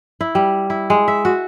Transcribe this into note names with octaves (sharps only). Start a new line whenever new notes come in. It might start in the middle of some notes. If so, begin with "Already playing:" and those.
E4
G3
E4
G#3
E5
F#4